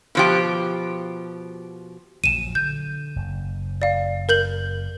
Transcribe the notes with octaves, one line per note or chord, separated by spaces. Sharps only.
B2 F3 G4
A#1 A#2 F#3 D#7 E7
D3 G6
F#1
D5 F5
A#4 G6 F#7